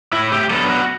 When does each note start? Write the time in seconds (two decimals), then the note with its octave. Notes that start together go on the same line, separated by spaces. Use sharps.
0.13 A2 E4
0.32 G4
0.50 F#3 B3 D4 A4
0.70 F#4